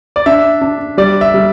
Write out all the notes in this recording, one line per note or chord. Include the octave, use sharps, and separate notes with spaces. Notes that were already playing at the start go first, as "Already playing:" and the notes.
D5
D4 E5
D4
G3 D5
E5
G3